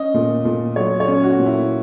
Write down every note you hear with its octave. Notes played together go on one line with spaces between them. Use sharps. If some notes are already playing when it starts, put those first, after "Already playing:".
Already playing: C#4 D#5
A#2
A#2
F#3 C#5
C#5
C#4
F#4
A#2
E4